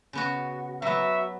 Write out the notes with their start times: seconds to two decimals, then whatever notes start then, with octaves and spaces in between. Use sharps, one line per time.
0.13 C#3 B3 F#4
0.82 F#3 B3 F#4 B4 E5